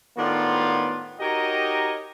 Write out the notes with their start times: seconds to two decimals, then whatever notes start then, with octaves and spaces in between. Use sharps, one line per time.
0.18 A2 D#3 B3 D4 F4
1.20 D#4 F#4 G4 A#4 C#5 D#5